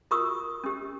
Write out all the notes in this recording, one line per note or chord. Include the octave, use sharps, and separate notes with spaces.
F4 F#4 A#4 C#6 D#6
C#4 G4